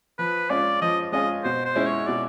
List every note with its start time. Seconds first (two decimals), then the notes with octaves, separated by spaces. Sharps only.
0.19 F3 B4
0.50 G#3 C#4 F4 G#4 D5
0.81 F3 D#5
1.12 G#3 C#4 F4 G#4 D#5
1.44 B2 C5
1.65 C5
1.76 G#3 C#4 E4
1.86 C#5
2.07 B2 D5